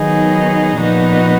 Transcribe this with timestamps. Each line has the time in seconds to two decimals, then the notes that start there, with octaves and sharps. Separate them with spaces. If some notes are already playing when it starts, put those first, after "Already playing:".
Already playing: D#3 F#3 B3 D#4 G#4
0.79 A#2 F3 B3 D#4 F#4